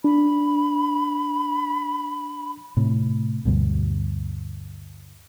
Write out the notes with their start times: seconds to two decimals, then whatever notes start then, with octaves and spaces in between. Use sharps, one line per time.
0.04 D4 B5
2.77 A2 C3
3.45 D2 G2 B2